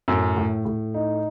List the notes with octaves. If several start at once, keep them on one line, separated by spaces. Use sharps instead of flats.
F#2 A2
A2
A2
D#4